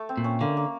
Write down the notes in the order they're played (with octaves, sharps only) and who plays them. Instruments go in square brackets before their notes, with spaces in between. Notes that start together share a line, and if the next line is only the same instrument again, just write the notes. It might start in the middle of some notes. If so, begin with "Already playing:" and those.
Already playing: [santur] A3
C4
[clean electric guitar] A#2
[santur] C#4
[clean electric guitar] D3 [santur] A#3
[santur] A#3